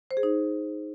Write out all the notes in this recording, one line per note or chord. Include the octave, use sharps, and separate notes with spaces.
C5
G#4
D#4